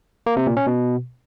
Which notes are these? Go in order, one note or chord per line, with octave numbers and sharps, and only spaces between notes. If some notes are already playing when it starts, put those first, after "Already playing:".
A#3
C3
A#2
C#4
B2